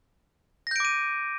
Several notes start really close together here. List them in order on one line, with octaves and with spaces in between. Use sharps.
A#6 G6 D7 D6 D#7